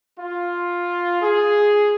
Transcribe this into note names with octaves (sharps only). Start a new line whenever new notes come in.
F4
G#4